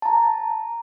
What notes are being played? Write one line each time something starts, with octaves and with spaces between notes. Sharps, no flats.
A5 A#5